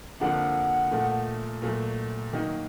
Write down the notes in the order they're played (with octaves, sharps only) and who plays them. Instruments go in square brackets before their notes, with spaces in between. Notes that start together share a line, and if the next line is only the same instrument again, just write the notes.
[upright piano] F2 D3 F3 A#3 D4 [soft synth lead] F#5
[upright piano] A#2 F3 A3
A#2 F#3 A3
D#3 F#3 A#3 D#4